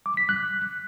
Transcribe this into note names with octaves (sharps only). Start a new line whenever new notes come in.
D6
B6
F#6